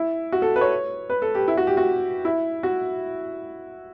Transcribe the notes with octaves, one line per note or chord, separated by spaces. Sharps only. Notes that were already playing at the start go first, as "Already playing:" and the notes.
Already playing: E4
F#4
A4
B4
C#5
B4
A4
G4
E4
F#4
G4
F#4
E4
F#4